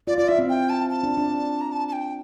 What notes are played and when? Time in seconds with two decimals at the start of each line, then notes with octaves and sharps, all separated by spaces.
0.07 F4 D5
0.18 F4 D5
0.28 E4 E5
0.39 C4
0.49 G5
0.70 A5
0.90 A5
1.03 D4
1.17 D4
1.61 A#5
1.72 A5
1.88 A5
1.93 G5